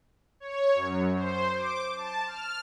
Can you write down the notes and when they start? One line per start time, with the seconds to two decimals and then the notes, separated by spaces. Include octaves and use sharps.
0.40 C#5
0.74 F#2
1.15 C5
1.57 D6
1.96 A5
2.27 F6